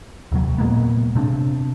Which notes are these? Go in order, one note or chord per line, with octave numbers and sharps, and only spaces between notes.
D#2 C3 F#3
A#2 G#3 A#3 B3
C3 C4 D4